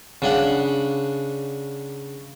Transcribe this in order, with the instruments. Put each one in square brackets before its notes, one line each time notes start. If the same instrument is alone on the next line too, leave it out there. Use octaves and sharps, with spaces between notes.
[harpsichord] C#3 D4 F#5